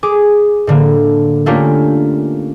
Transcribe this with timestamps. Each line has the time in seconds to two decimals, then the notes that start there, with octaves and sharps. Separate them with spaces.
0.03 G#4 D6
0.67 A2 D3 A#3
1.46 A3 A#3 C#4 D4 F4 G4